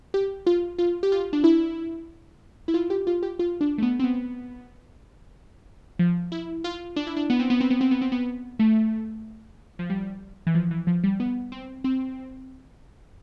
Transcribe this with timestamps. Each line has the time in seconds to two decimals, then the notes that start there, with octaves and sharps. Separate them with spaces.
0.14 G4
0.47 F4
0.79 F4
1.03 G4
1.12 F4
1.33 D4
1.44 E4
2.68 E4
2.74 F4
2.90 G4
3.07 F4
3.23 G4
3.39 F4
3.61 D4
3.78 A3
3.82 B3
4.00 C4
4.04 B3
5.99 F3
6.32 E4
6.64 F4
6.96 D4
7.07 E4
7.17 D4
7.30 B3
7.39 C4
7.50 B3
7.61 C4
7.70 B3
7.81 C4
7.91 B3
8.02 C4
8.12 B3
8.59 A3
9.79 F3
9.90 G3
10.47 E3
10.55 F3
10.71 E3
10.87 F3
11.04 G3
11.20 B3
11.52 C4
11.84 C4